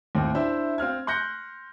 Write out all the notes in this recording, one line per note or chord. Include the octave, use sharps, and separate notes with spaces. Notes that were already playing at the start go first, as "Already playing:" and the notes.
D#2 A2 C4
D4 E4 C5 E5
C4 F5 F6 G#6
C6 F#6 G6 A#6 C#7